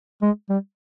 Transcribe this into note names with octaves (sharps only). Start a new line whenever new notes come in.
G#3
G3